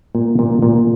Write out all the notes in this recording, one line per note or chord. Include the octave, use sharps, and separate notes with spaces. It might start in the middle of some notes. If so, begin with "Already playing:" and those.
A#2
A#2
A#2